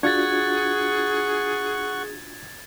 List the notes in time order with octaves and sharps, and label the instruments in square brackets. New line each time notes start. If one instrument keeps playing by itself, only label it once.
[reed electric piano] D4 F4 F#4 [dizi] G#4 [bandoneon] F#5 C#6 [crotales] G#6 A6